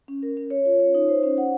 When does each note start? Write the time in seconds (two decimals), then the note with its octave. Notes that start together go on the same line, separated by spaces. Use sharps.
0.08 C#4
0.23 A#4
0.37 C#4
0.50 C#5
0.65 F4
0.80 C#5
0.94 D#4
1.09 C5
1.23 C#4
1.38 F#5